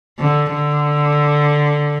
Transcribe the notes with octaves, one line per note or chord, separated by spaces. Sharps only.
D3
D3